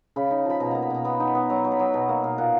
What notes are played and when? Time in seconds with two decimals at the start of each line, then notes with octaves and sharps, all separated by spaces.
0.16 C#3 B5
0.31 D#4
0.45 F3 B5
0.60 B2 A#5
0.71 A#3 A#5
0.82 B5
0.90 B2 A#5
1.04 B3 B5
1.20 D#4
1.27 B5
1.35 B3
1.50 F#3 A#5
1.65 F#3
1.72 B5
1.79 F#3
1.94 B2 A#5
2.09 A#3
2.24 B2 F5
2.38 A#2 F#5